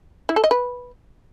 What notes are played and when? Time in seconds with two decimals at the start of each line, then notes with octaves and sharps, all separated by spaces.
0.29 E4
0.36 A4
0.44 D#5
0.51 B4